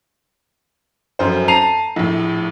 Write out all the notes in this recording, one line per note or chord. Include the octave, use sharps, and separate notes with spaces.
F1 F#2 C5
A5 A#5 C7 D#7 F7
A#1 A2